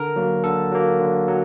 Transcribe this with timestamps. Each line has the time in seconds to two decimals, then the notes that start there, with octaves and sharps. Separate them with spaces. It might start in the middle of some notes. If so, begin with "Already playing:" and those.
Already playing: D3 A#4
0.16 F#3 A#3
0.44 D3 A4
0.72 F#3 A#3
1.00 D3
1.28 F#3